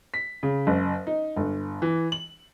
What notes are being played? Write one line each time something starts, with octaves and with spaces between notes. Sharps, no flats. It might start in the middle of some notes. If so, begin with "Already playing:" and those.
B6
C#3
F#1
D#4
G1
E3
F#7